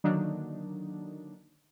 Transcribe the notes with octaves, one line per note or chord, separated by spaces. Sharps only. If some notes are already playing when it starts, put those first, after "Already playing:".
D3 D#3 F#3 A#3 D4 D#4